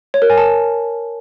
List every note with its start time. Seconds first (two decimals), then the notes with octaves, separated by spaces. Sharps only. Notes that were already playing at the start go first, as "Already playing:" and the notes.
0.14 C#5
0.22 A#4
0.30 G#5
0.38 A5